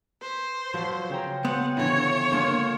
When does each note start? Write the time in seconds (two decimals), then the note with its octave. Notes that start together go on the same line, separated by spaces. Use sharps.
0.21 B4 C5
0.74 F3 F#3 B4
1.10 C#3 G5 A#5
1.45 B3 C4 F#5
1.77 D3 E3 F3 C#4 C#5
2.32 D3 G#3 A#3 F4